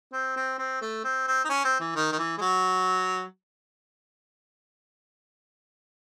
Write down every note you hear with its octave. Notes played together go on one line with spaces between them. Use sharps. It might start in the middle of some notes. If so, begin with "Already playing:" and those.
C4
C4
C4
A3
C4
C4
D#4
C#4
C4
E3
D#3
D#3
E3
G#3
F#3